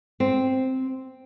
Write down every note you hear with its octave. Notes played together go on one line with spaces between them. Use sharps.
C4